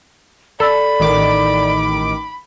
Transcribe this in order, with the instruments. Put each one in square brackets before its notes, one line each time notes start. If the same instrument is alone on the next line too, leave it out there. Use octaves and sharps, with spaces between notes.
[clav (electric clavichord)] A4 [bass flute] D5 [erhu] B5
[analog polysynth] A1 D#3 D6